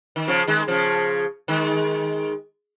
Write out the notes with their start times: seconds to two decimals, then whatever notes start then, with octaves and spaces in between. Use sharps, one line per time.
0.16 D#3
0.28 C#3 F3
0.48 D#3 G#3
0.68 C#3 F3
1.48 D#3 G#3